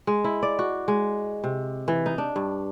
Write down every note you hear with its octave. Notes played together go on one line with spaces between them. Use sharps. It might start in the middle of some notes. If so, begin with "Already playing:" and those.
G#3
E4
D5
F#4
G#3
C3
E3
D#4
D4
G2